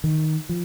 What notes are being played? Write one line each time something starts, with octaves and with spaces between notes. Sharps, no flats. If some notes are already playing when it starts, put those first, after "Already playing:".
D#3
F3